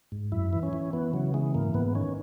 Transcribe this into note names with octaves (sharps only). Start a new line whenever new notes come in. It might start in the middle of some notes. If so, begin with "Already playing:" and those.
G#2
F#2 E4
E3
C#4
E3
E3 B3
C#3 F#3
E3 G#3
G#2 A#3
G#2 B3
D#3 C#4